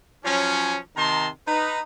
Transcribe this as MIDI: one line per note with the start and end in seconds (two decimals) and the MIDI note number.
0.25 0.79 53
0.25 0.79 54
0.25 0.79 61
0.97 1.28 48
0.97 1.28 51
0.97 1.28 81
0.97 1.28 82
0.97 1.28 84
1.48 1.80 63
1.48 1.80 71